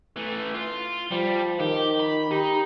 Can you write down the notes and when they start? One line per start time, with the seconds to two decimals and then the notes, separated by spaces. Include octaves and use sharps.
0.17 E3 A3
0.54 F4
1.11 F3 G3
1.60 D#3 G4
2.00 B5
2.31 D#4 G4